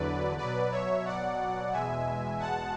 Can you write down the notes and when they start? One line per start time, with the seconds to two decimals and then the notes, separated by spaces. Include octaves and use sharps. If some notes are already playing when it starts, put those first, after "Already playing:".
Already playing: E2 D3 F#3 B4 D5
0.38 B2 F#3 B4 D5
0.71 C#5 E5
1.05 D5 F#5
1.72 E2 B2 G#3 E5 G#5
2.40 F#5 A5